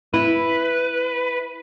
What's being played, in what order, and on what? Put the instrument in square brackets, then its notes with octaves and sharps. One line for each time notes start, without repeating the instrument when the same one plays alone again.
[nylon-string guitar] E4 [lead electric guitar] B4